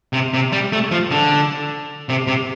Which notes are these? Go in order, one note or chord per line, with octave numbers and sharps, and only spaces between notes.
C3
C3
G3
A3
F3
D3
C3
C3